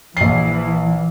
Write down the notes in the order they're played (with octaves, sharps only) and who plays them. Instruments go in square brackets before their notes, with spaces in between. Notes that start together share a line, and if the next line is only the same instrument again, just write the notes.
[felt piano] A#1 C7 [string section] E3